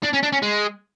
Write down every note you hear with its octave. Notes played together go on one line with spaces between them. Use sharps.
D4
C#4
D4
C#4
G#3